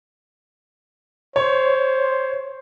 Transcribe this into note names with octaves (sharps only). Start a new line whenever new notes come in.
C5 C#5